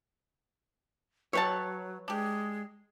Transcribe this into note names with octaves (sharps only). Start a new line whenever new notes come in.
F#3 B4 C#5 E5 G5 A5
G#3 D4 G4